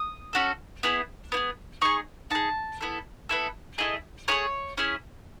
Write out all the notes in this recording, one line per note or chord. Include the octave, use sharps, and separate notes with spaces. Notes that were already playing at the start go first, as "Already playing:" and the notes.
Already playing: D#6
C#4 F#4 A4
B3 E4 G#4
B3 E4 G#4
D#4 G#4 C#6
D#4 G#4 A5
B3 E4 A4
B3 E4 A4
A3 E4 G#4 D#5
A3 E4 G#4 C#5
C#4 E4 G#4